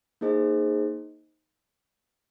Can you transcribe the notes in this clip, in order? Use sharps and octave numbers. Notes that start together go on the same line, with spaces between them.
A#3 D#4 G#4 C5 D#5